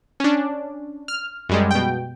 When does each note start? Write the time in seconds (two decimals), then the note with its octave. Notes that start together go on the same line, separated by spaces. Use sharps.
0.20 C#4 D4
1.08 F6
1.49 F#2 G3 G#3
1.71 B2 G5